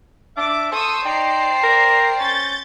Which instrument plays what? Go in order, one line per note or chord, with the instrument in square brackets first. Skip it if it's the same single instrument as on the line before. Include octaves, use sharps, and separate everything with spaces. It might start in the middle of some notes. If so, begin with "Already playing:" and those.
[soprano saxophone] D4 [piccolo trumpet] E5 [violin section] D6
[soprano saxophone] A4 [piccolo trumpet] C5 [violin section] C#6 D#6 E6
[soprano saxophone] D#4 [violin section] D5 A#5 C7 [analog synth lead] G5
[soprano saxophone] A#4
[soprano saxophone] C#4 [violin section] G6 A6